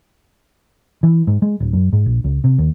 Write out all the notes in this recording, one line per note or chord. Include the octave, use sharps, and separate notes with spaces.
E3
G#2
G#3
D1
F#2
G#2
A#1
C#2
C3
D#2